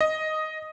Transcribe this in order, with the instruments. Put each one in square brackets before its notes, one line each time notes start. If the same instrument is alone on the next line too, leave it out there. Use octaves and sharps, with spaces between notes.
[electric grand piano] D#5